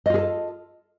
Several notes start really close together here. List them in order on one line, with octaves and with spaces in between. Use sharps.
D#5 F4 G#4 A4